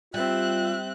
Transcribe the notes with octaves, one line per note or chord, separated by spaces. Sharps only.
G3 C4 F4 E5 F#6